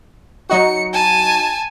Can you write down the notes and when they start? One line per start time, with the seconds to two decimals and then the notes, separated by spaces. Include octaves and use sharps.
0.50 F#3 D#4 F#4 C#7
0.93 G#5 A5